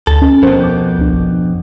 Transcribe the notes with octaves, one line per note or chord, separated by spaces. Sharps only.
D2 A4
C#4
F2 B2 A#4 C5
D6 G6
C#2 D4
G#1